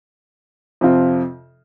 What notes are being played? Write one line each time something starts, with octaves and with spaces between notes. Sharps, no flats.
F2 C3 F3 C4 F4